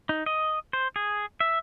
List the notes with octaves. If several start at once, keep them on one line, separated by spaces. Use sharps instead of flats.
D#4
D#5
C5
G#4
E5